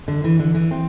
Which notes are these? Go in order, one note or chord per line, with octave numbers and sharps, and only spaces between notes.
D3
E3
D3
E3
C4